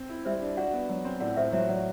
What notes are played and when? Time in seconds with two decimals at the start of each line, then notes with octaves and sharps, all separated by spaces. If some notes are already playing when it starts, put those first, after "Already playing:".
Already playing: C4
0.09 E4
0.25 G3 C5 E5
0.42 D4
0.57 F#4 D5 F#5
0.73 B3
0.89 F#3
1.05 C4
1.21 A2 D5 F#5
1.36 A2 C5 E5
1.52 F#3 C5 E5
1.69 F#3 D5 F#5